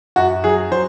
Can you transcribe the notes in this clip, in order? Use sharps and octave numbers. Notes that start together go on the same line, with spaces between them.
F#2 F#4
F#3 G#4
F#3 C5